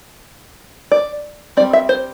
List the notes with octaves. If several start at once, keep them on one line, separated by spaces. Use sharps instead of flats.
D5
G3 C4 D5
E5
C5